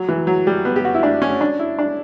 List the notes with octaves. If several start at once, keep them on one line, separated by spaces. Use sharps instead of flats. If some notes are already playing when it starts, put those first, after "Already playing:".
Already playing: F#3
E3
F#3
G3
B3
G4
F#4
E4
D4
C#4
D4
E4
D4